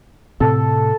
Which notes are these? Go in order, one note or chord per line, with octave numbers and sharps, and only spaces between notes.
A2 C3 C4 A4